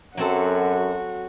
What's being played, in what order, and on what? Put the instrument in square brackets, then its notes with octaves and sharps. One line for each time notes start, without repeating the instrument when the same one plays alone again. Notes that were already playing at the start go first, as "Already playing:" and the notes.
[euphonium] F#2 [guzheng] F#3 C4 A4 [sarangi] F#4